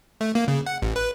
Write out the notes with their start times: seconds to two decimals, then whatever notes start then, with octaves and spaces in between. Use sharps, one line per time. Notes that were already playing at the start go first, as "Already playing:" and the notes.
0.21 A3
0.35 A#3
0.48 C#3
0.67 F#5
0.82 A1
0.96 B4